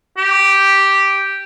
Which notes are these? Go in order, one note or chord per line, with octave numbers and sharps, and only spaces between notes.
G4